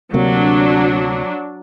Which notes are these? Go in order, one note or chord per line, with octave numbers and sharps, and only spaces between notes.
D2 C3 F#3 A#3 D4